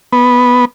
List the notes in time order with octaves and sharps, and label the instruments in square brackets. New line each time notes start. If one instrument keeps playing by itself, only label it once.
[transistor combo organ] B3